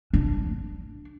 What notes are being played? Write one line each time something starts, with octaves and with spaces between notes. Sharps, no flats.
D4